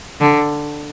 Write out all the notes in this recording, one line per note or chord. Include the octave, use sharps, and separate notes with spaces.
D3